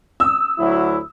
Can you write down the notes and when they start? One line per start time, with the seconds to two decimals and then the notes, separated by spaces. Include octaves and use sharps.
0.20 D#6 E6
0.59 D2 F#3 E4